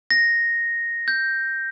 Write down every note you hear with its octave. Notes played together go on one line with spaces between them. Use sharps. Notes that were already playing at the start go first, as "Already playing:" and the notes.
A#6
G6